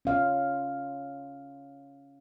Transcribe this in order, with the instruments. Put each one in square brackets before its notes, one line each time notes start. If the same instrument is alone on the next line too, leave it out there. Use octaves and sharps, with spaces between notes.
[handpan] C#4 F5